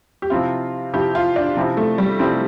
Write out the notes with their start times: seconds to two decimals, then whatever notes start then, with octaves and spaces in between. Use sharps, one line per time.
0.22 G4
0.30 C3 F3 C4 E4 F4
0.93 C3 F3 C4 E4 G4
1.15 F4
1.36 D4
1.56 C3 F3 C4 E4
1.77 A3
1.98 G3
2.19 C3 F3 C4 E4